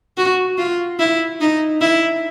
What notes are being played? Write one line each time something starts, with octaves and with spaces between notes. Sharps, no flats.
F#4
F4
E4
D#4
E4